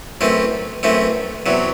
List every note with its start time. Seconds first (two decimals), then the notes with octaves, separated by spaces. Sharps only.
0.21 F#2 E3 A3 C4
0.83 F#2 E3 A3 C4
1.46 E2 C3 F#3